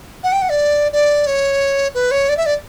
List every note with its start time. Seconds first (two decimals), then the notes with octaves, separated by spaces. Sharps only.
0.24 F#5
0.32 G5
0.42 F#5
0.50 D5
0.93 D5
1.27 C#5
1.94 B4
2.11 C#5
2.29 D5
2.37 E5
2.46 D5